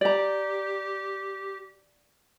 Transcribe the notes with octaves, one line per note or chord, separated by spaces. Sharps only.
G4 D5 A#5